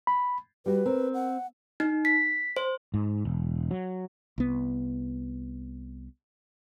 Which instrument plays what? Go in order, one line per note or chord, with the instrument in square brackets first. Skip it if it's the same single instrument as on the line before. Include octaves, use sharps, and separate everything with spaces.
[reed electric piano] B5
[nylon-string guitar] G3 F#4 [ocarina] B4
[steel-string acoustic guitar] C4 [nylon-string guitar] A#4
[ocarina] F#5
[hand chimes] D#4
B6
C5
[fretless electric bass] G#2
E1
F#3
C2 B3